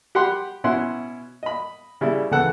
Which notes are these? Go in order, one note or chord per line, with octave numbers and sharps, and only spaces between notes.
G4 F#5 B5 C6
B2 C#4 E4 F#5 C6
D#5 B5
C#3 G3 E4
C#2 C#3 E3 A4 F#5